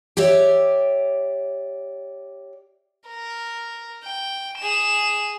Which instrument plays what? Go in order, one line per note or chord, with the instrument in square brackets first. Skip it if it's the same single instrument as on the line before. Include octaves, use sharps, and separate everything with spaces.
[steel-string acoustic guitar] G4 C#5 D5 E5
[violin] A#4
G5
G#4 E7